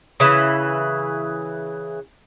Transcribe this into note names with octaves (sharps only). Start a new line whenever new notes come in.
C#3 E3